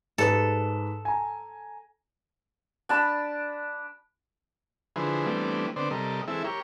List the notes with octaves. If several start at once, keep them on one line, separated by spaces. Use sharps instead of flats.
G#2 G4 A4 B4
G#5 A#5
D4 A5 B5
D3 F3 E4 G#4 B4 C5
E3 G3 A3 B3 C4 D4
D3 B3 C4 C5 D5
C3 G3 A4 A#4 D#5
E3 G#3 C4 E4 A4 E5
G4 A#4 C#5